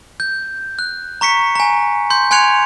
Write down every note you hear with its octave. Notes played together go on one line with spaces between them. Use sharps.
G6
F#6
A#5 C#6 B6 C#7
G#5 A#5
C6 G6
G#5 C6 F#6 G#6 C#7 F7